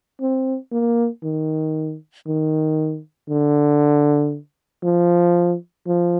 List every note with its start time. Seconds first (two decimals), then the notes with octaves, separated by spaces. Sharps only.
0.21 C4
0.72 A#3
1.24 D#3
2.27 D#3
3.29 D3
4.83 F3
5.87 F3